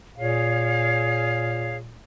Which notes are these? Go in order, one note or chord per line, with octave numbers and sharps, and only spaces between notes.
A#2 G#4 C#5 F5